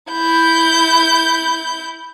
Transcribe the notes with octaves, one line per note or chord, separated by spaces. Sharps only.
E4 G6